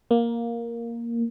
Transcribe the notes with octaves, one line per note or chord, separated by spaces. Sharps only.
A#3